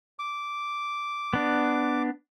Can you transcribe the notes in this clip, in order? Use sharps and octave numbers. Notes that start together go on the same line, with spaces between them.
D6
B3 D4